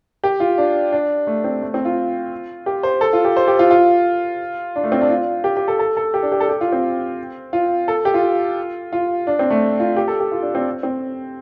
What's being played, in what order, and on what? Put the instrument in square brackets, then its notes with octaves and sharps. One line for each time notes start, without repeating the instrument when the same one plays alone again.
[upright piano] G4
F4
D4
D4
A3
C4
A3
C4
F4
G4
C5
A4
F4
G4
C5
G4
F4
F4
D4
A3
C4
D4
F4
G4
G4
A4
A4
A4
G4
D4
G4
A4
G4
F4
C4
F4
A4
G4
F4
F4
D4
C4
A3
F4
G4
A4
G4
F4
D4
C4
C4